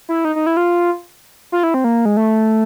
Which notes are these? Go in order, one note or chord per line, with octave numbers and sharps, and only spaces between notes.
E4
D#4
D#4
E4
F4
F4
E4
C4
A#3
G#3
A3